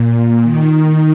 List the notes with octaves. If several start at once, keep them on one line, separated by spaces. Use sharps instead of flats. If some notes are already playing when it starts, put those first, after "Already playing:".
Already playing: A#2
D#3